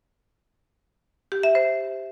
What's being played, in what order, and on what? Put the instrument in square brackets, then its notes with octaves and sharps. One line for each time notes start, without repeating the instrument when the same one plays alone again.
[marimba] G4
E5
C5